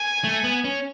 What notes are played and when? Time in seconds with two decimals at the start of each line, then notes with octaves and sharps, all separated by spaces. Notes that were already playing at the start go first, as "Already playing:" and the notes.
Already playing: G#5
0.24 A3
0.44 B3
0.64 C#4